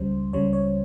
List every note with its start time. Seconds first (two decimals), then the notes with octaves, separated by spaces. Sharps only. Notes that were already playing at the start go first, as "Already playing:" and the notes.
Already playing: C#2 C#3 G3 C5
0.33 C#2 C#3 G3 C#5
0.53 C#5